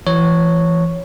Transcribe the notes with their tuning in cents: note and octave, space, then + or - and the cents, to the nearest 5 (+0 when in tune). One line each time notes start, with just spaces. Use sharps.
E3 +30 C#5 +0